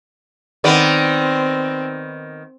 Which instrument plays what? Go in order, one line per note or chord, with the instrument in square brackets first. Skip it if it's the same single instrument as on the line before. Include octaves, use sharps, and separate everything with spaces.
[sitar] D#3 B3 D5 [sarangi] C4